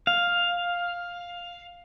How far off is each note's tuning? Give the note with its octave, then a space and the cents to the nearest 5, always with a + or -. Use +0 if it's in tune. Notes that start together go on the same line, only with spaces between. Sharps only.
F5 +5